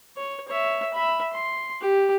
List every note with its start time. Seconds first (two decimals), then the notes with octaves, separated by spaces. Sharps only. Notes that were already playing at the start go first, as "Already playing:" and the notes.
0.17 C#5
0.48 C#5 E5
0.93 E5 B5
1.33 C6
1.81 G4